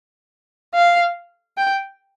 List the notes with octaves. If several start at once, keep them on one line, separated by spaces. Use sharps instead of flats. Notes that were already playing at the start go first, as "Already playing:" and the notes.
F5
G5